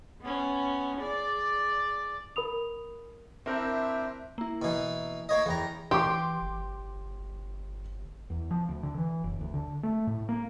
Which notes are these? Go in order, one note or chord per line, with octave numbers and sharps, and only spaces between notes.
B3 C#4
G#4 D5
A#4 B5 D#6 F7
C4 D4 E4 A#4 C5 E5
A#3 E4
B2 E3
A#3 C#5 D#5
E2 E3 G5 A#5
E3 G4 C6 D6
G1
E2
F3
D2
D3
E3
F#1
D2
D3
A3
A2
A#3